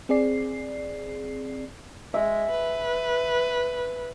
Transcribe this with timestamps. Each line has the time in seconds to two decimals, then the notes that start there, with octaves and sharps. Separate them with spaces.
0.09 C4 G#4 D5 C7
2.14 G#3 E5
2.51 B4